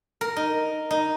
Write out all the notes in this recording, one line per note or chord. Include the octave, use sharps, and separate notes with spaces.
A#4
D#4
D#4